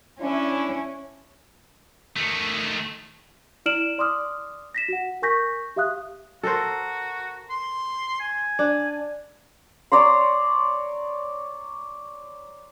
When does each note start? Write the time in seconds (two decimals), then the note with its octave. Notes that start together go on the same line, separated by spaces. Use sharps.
0.20 C#4 D4 E4
2.16 D#3 A3
3.66 E4 D5 F6 D7 E7 F#7
3.98 D5 C6 D6 D#6 F6
4.75 A#6 B6 E7
4.88 F#4 F#5
5.22 A#4 G#5 C#6 G6 A#6 B6
5.76 G4 E5 F5 D#6 F#6
6.43 F#4 A4 A#4 C5
7.50 C6
8.20 G#5
8.59 D4
9.92 C#5 D5 A#5 C6